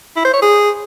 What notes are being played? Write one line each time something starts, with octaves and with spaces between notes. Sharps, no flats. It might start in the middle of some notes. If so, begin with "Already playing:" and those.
E4
C5
C#5
G#4